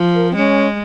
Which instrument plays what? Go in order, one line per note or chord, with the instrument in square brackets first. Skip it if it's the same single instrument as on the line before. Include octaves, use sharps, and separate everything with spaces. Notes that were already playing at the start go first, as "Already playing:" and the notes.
Already playing: [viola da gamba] F3
[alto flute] A#4
C4
[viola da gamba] G#3 [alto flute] C#4